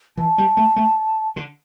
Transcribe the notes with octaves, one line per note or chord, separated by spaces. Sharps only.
E3 A5
G3
A3
A3
D3